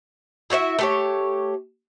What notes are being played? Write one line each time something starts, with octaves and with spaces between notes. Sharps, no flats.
E4 F#4 C#5 E5
A3 G4 C#5